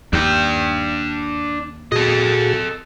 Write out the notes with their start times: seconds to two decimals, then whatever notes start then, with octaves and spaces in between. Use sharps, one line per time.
0.13 D#2 D4 G5
1.92 A#2 F#4 G#4 A4 D#5